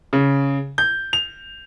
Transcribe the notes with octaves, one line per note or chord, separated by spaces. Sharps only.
C#3
G6
F7